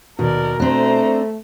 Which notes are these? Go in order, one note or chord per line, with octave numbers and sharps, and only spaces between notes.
D#2 B2 A#4 D5
A3 C4 D4 C5 A#5